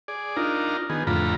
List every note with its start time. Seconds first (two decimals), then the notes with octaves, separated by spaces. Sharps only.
0.08 G#4 D5
0.37 D4 D#4 F4 A#4
0.90 D#3 B3 G#4
1.07 F2 A2 D3 F4 A#5 B5